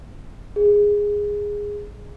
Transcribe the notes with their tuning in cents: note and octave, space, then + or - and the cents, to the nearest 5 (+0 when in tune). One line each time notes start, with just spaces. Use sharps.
G#4 -10